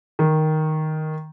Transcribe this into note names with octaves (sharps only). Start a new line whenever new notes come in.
D#3